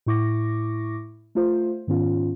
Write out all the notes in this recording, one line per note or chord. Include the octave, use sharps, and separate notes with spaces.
A2 E4 C#6 D6 A#6
A3 F4 C5
G#2 D#3 B3 C#4 F4